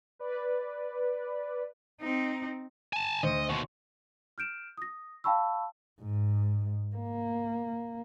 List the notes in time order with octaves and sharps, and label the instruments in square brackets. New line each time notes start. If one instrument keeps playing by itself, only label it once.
[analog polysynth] B4 D5
[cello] C4 D#4
[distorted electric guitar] G#5 A5
[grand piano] D2 C5 C#7 [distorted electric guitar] D#5
[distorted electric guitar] D#2 B2 [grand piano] C6 C#6
[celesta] F6 G6 D7 E7
D#6 A#6
F5 G5 A5 B5 C#6 E6
[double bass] G#2
A#3